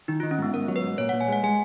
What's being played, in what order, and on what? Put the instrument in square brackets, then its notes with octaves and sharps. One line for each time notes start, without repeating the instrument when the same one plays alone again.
[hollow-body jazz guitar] D#3 [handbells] D#4
[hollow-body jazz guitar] D#3 [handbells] F4
[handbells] C#4
[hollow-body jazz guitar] G#2 [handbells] B3
[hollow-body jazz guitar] G#2 [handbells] A#4
[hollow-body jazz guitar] F#3
[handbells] B4
[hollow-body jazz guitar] G#2
[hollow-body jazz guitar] A#2 [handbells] C#5
[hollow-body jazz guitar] A#2 [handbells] F#5
[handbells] G#5
[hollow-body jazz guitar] G#3 [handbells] F#5
[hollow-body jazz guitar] G#3 [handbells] G#5